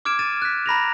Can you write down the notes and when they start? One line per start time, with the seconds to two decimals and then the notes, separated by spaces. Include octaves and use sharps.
0.05 D6 F6 G#6 D7 E7
0.19 A6 D#7 E7
0.42 F#6 B6
0.66 A#5 B5 A#6 F7